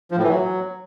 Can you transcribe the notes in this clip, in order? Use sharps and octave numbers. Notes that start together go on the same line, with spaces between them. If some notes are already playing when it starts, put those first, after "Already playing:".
F3
A2
E3
F#3